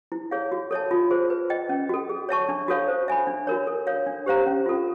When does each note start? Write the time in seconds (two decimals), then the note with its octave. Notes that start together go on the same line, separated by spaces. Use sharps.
0.12 E4
0.31 G#4 C#5 F5
0.52 F#4
0.71 A4 C#5 E5 A5
0.91 F4
1.11 G#4 C5
1.30 B4
1.50 D#5 G5
1.69 C#4
1.89 F#4 A4
2.09 G#4
2.29 C#5 E5 A5 C#6
2.49 D4
2.68 F#4 A4 C#5 F5
2.88 C5
3.08 E5 G#5 B5
3.27 D4
3.47 F#4 A#4 C#5
3.67 A4
3.87 C#5 F5
4.06 D4
4.26 G4 C5 F5 A#5
4.46 C#4
4.66 F4 A4